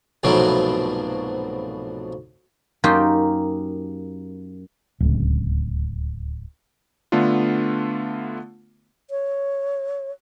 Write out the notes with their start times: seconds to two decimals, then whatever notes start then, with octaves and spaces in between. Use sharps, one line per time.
0.23 C2 G#2 B2 F3 F#3 A3
2.84 F#2 A#3 D#4 F4 G4 G5
5.00 D1 C#2
7.12 D3 A3 B3 D4 F4
9.10 C#5